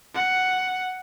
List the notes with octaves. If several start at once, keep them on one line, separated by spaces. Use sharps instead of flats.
F#5